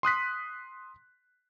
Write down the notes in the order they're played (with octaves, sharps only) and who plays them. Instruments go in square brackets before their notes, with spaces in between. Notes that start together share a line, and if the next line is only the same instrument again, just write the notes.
[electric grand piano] C6 D#6 F#6 B6